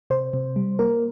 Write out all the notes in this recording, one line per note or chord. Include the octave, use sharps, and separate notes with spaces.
C3 C5
C3
G3
A#3 A#4